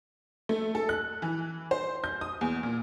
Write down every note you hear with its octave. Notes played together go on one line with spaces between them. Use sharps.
A3
A4
F#6
E3
C5
G6
D#6
E2
A#2